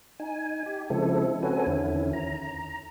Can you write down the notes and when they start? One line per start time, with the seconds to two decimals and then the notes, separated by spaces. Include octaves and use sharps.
0.19 D#4 G#5
0.66 G4
0.90 C#3 F3 G#3 C4 E4 A4
1.43 C4 C#4 F#4 A4 B4 G#5
1.67 E2 D3 D#3 C#4 E4
2.13 A#5